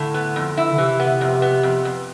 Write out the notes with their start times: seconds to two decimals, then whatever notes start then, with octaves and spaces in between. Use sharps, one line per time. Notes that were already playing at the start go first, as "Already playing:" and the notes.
Already playing: A2 D3
0.14 B3
0.36 F2
0.57 E4
0.73 D3
0.78 C3 E3
1.00 B3
1.21 F2
1.42 B3
1.63 F2
1.85 F2